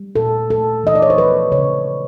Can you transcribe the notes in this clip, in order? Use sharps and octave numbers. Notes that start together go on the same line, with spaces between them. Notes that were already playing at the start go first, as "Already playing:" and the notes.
Already playing: G3
A#2 A4
A3 A4
E3 D#5
D5
C#5
C5
F3 B4
C#3 C#5